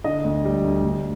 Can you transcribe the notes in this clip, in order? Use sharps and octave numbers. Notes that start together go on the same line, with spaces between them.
D3 D#5
D2
G3
D2
D2